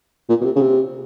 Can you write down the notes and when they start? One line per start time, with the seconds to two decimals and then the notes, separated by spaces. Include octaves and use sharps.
0.29 A#2
0.41 B2
0.45 C3
0.56 C#3
0.61 C3